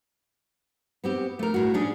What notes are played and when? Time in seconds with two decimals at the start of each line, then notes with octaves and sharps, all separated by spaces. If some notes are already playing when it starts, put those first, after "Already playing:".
1.04 B3 C4 G4
1.39 A3 A#4
1.54 A2 F#4
1.74 C#4 D4 G#4